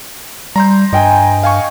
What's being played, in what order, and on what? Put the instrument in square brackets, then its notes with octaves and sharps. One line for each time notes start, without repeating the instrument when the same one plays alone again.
[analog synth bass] G3 [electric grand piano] A#5 C6 G6
[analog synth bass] G2 [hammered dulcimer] D#5 G5 G#5
[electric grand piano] F5 G#5 C#6